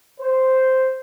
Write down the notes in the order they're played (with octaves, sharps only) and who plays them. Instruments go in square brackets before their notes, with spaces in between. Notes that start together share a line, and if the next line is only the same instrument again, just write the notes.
[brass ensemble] C5